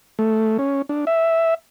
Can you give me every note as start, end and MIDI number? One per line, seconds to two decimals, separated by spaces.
0.19 0.57 57
0.59 0.82 61
0.89 1.05 62
1.07 1.54 76